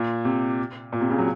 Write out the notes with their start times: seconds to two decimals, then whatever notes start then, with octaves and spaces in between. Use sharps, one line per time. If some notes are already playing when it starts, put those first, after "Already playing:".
Already playing: A#2
0.25 C3
0.92 A#2
1.01 C3
1.10 C#3
1.18 F#3